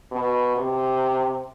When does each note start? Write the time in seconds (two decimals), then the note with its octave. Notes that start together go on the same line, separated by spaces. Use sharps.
0.11 B2
0.56 C3